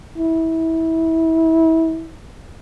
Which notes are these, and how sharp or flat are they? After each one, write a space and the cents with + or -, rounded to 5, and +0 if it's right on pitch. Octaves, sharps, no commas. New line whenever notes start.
E4 -25